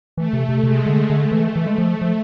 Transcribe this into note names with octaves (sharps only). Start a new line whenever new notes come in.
E3 A3
C3
C3
C3 G#3
D3
D3 A3
E3
E3
G#3
F3
F3